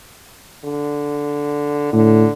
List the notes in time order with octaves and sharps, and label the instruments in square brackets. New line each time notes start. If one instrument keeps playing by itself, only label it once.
[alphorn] D3
[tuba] A2 [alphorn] D3